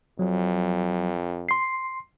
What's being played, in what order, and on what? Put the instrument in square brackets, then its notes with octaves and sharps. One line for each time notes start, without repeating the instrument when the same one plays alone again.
[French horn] F2 [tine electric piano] F#3
[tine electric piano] C6 C7